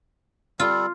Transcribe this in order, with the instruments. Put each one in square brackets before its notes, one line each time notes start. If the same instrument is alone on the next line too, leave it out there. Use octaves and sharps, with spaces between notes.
[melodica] G3 A4 [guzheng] F4